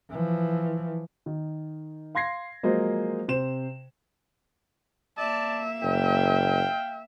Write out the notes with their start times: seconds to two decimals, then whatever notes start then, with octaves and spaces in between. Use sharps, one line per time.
0.11 E3 F3
1.26 D#3
2.15 F5 C6 G#6 A#6 C7
2.63 F3 F#3 G#3 A#3 C5 D#5
3.28 C3 C5 E7
5.18 A#3 D5 E5 A5
5.83 F#1 F5 G5